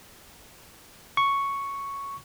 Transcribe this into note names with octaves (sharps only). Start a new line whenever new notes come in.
C#6